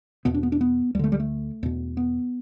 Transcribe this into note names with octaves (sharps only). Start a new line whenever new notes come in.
E2 B2 B3
D4
B3
D4
B3
D2 D3 G3 A3
G3
A3
E2 B2
B3